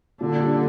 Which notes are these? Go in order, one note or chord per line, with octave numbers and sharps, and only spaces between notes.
A#2 D3
G3 D4